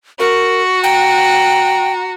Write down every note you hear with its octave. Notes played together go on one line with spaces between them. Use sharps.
F#4 A#4 C#6
G5 A#5